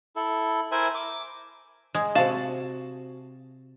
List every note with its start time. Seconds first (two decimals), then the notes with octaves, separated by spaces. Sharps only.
0.16 E4 A4
0.71 E4 A#4 C5 E5 G#5
0.95 D6
1.94 G#3
2.15 C3 F#4 F5 A5